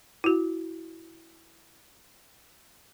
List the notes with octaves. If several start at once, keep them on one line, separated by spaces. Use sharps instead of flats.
E4 F#4